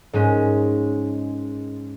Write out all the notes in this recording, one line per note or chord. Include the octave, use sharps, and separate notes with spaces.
G#2 G#3 C#4